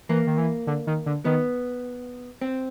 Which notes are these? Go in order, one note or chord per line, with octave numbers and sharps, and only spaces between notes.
E3 A#3
D#3
E3
D3
D#3
D3
D#3 B3
C4